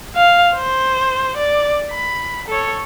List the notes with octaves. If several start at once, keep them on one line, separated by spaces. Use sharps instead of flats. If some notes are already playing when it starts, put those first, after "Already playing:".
F5
C5
D5
B5
A4 C#5